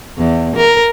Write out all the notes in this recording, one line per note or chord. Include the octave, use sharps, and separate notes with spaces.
E2
A#4